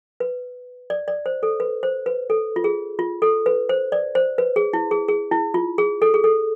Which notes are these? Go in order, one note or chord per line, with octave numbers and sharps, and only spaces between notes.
B4
D5
D5
C5
A4
B4
C5
B4
A4
F4
G#4
F4
A4
B4
C5
D5
C5
B4
G#4
E4
G#4
G#4
E4
F4
G#4
A4
G#4
A4